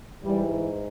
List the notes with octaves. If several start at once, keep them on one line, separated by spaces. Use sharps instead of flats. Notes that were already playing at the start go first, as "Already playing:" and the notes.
G#2 E3 G3